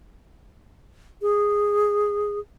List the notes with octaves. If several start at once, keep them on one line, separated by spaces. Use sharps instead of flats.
G#4